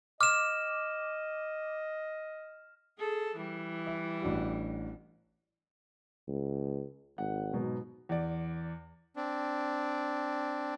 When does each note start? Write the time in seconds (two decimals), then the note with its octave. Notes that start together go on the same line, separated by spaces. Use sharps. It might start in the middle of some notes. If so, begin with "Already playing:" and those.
0.21 D#5 D6 F6 E7
2.98 G#4 A4
3.36 E3 G3
3.87 E5
4.22 A1 D4 F#4
6.28 C#2
7.18 G#1 F#5
7.53 G#2 B2 F#3
8.09 E2 D5
9.16 C4 D4